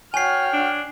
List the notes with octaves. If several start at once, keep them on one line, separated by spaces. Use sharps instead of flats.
F#4 C#5 G5 G#5 F6 C7
D4